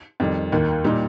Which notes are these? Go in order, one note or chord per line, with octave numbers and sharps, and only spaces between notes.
F2 D#3 G3
D#2 D#3 A#3
A#2 G3 D#4